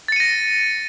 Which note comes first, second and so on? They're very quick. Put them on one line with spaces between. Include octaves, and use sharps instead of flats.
A6 C#7 D#7 A#6